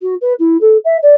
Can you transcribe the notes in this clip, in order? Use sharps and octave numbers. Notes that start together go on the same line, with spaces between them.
F#4
B4
E4
A4
E5
D5